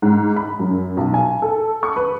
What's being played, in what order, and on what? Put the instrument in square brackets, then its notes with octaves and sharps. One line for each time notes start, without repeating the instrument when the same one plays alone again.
[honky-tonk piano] G#2
B5
F#2
B1
G#5
A4
C#6
B4